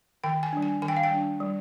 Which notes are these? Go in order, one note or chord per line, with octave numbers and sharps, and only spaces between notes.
D#3 G5
G#5
G3 D4
G#5
D#3 G#5
G5
F5
G5
G3 D4
G3